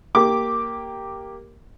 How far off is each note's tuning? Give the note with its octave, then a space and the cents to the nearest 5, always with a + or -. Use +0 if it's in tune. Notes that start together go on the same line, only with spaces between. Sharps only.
A#3 -5 G4 +0 D6 +0